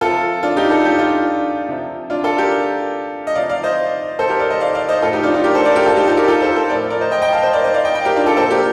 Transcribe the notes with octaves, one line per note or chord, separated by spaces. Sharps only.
C3 F3 F4 A4
D4 F4
D#4 G4
F4 A4
F4
D#4 G4
D4 F4
C3 F3
D4 F4
F4 A4
G4 A#4
D#5
C3 F3 D5 F5
D5 F5
C5 D#5
A4 C5
G4 A#4
A#4 D5
C5 D#5
D5 F5
D5 F5
C5 D#5
A2 F3 F4 A4
D#4 G4
D4 F4
D4 F4
G4 A#4
A4 C5
A#4 D5
C5
G4 A#4
F4 A4
D#4 G4
F4 A4
G4 A#4
F4 A4
A4 C5
A4 C5
A2 F3 A#4 D5
A#4 D5
C5 D#5
D#5 G5
D#5 G5
F5 A5
C5 D#5
A#4 D5
C5 D#5
D5 F5
D#5 G5
D#5 G5
G4 A#4
D4 F4
F4 A4
A#2 F3 A4 C5
G4 A#4